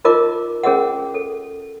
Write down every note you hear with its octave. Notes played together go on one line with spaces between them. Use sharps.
D#4 F4 A#4 D#5 D6
C#4 G#4 A#4 D#5 F#5
A4